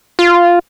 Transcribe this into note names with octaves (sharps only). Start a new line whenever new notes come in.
F4